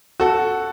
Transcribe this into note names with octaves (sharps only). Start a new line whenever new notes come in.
F#4 A4